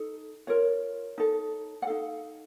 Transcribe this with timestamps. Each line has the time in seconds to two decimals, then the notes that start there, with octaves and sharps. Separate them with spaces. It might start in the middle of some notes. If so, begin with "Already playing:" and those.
Already playing: D#4 A4
0.47 F4 A#4 C#5
1.18 D#4 A4
1.82 F#5
1.87 D#4 A4 F5